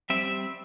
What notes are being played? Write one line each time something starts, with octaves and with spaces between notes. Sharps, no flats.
G3 C4 E5